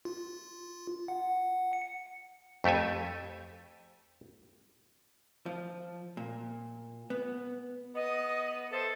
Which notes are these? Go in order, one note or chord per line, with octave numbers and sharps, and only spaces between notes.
F4
F#5
C#7
F2 A3 G4 A4 G#5
F3
A#2
B3
B3 D#5
A4 C5 E5